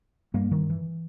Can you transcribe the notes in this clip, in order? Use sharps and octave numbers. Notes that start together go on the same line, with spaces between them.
G2 G3 A#3
D#3 G3
E3